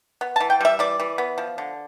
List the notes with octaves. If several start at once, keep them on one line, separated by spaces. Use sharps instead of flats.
B3
E3 A5
G5
G3 E5
E3 D5
E3
B3
F3
D3